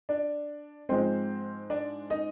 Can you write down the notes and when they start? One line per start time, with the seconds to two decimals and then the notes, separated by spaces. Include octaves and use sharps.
0.09 D4 D5
0.89 G#2 F3 G#3 C4 C5
1.70 D4 D5
2.10 D#4 D#5